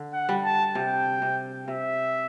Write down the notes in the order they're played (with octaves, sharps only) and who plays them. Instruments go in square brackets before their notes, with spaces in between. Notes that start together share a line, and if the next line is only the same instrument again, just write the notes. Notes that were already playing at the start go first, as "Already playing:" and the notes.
Already playing: [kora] D3
[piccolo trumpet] F#5
[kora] G3
[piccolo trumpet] A5
[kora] C3 [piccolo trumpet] G5
[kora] C3
[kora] C3 [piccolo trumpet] E5